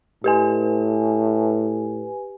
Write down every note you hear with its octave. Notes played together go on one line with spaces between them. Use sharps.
A2 G4 B4 G#5